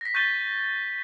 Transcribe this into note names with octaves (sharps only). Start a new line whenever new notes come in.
A#6 B6
C#6 G6 A6 B6 D#7 G7